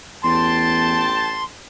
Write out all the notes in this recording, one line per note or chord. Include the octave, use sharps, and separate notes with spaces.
A1 E2 G5 A5 C6